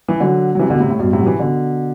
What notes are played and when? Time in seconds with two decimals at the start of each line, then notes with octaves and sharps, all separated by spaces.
0.08 E3
0.20 D3 F#3
0.55 F#3
0.59 C3 E3
0.70 B2 D3
0.80 A2 C3
0.90 A2
0.99 G2 B2
1.13 A2 C3
1.20 F#3
1.26 C3 E3
1.39 B2 D3